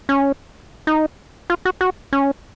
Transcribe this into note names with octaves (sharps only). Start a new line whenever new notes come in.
C#4
D#4
F4
F#4
F#4
C#4